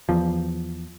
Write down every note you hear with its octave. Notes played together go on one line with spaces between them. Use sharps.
E2 F3